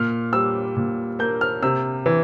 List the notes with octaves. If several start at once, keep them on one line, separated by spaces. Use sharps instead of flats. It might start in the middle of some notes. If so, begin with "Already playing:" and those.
Already playing: A#2 F6
G3 E6
A#2
A#3 G6
F6
C3 E6
E3